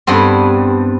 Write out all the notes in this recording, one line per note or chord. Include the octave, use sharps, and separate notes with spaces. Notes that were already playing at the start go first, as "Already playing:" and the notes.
G2 B3 C4